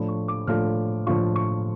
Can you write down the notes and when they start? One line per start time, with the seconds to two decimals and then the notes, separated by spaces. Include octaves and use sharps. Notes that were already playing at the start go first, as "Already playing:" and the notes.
Already playing: A2 F3 A3 D4 F4 B5
0.09 C#6
0.28 D6
0.47 A2 F3 A3 D4 F4 F6
1.07 A2 F3 A3 D4 F4 C#6
1.36 C#6